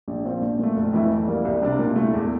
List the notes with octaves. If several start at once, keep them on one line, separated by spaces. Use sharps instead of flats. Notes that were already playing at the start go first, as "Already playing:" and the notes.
A#1
A#2 F3 C4
A#1
A#2 A3
F1
F2 E3 A3 E4
A2
G3 A#3
C2
C3 G3 D4
A#2
A3 E4
E2